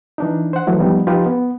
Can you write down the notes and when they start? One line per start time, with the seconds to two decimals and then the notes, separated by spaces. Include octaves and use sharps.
0.18 E3 D4 D#4
0.53 C5 F#5
0.67 E3 F#3 A3
0.79 F3 G3 B3 D#4
1.07 F3 D#4 F4 G4 B4
1.26 B3